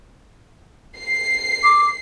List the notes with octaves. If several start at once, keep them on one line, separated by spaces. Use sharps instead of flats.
C7
D6